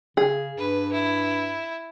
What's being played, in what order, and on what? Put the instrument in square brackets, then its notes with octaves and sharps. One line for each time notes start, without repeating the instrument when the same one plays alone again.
[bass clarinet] C#3 [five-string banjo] G#4
[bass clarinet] G2 [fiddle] B4
[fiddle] E4